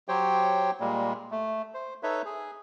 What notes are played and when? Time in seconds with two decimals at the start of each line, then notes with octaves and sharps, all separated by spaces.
0.08 F#3 G4 C5 C#5 G5
0.80 A#2 G3 G#3 A#3
1.31 A3
1.74 C5
2.03 D#4 A4 B4 C#5 E5
2.25 G#4